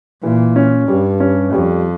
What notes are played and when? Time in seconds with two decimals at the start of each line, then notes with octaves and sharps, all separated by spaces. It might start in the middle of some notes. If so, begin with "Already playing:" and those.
0.23 A#2 E3
0.56 C#4
0.88 G2 G3
1.20 C#4
1.52 F2 G3